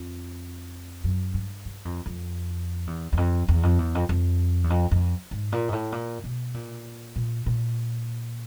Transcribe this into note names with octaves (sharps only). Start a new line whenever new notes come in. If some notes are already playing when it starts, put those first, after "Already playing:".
Already playing: F2
F#2
G2
G2
F2
F2
E2
E2
F2
E2
F2
E2
F2
F2
E2
F2
F2
G#2
A#2
G#2
A2
A#2
B2
A#2
A#2
A#2